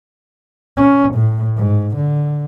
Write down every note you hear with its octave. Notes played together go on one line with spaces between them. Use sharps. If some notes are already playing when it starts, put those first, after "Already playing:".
C#4
A2
G#2
D3